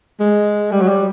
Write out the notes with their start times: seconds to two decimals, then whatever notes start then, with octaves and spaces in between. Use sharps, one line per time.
0.20 G#3
0.72 G3
0.81 F#3
0.88 G3